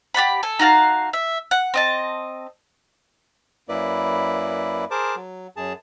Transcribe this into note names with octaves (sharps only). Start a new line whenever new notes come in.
G4 D5 F#5 B5
A4 G#5
D#4 F#4 F5 A5
E5
F#5
C4 D#5 A5
F#2 A#3 E4 B4 D5
G#4 A#4 C5 A5 D6
F#3
F#2 G#4 A5